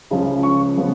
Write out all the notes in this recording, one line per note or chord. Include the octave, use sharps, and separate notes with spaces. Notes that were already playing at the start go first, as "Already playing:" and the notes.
C#2 C#3 F3
C#6
C#3 F3 B3